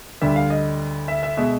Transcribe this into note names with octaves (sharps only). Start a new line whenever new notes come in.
D2 D3 G3 E5
F5
D#5
E5
E5
B2 G#3 E5